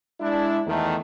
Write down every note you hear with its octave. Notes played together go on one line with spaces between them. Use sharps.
G#3 D4 E4
E2 D#3 A3